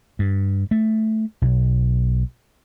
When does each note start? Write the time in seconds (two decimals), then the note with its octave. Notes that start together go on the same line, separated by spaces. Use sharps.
0.19 G2
0.71 A3
1.42 B1